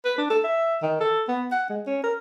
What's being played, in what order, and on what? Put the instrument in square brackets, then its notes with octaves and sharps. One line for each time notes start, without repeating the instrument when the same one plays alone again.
[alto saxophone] B4
D4
A4
E5
D#3
A4
B3
F#5
G#3
C#4
A#4